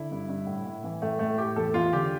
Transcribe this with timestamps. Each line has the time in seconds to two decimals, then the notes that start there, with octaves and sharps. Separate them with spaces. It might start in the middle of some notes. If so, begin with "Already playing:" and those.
Already playing: D3 E4
0.11 G2
0.29 G2
0.47 A2
0.65 A2
0.84 E3
1.02 A2 A3
1.19 A2 A3
1.38 A2 G4
1.56 E2 A4
1.74 E2 F4
1.93 D3 G4